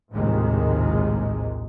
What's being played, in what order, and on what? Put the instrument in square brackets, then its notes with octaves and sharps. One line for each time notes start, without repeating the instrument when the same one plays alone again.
[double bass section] A#1 D#2 A2 C3 D#3 G#3